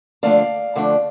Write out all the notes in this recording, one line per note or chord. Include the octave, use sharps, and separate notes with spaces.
D3 F3 A3 D4 D5 F5
D3 F3 A3 D4